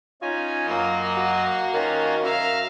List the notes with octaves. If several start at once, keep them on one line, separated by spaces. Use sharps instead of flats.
C#4 D#4 F4 G#5
F#2 A#3 D#5
F#4
D#3 C#4 F4 F#4
F#2 E5 F5 A#5